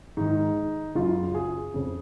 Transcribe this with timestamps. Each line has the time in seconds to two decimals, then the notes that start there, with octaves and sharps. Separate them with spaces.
0.17 G#2 D#3 D#4
0.95 F#2 C#3 F4
1.35 G#4
1.74 F2 C#3